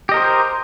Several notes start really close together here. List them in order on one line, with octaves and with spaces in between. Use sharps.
G4 D#5 A#4 C5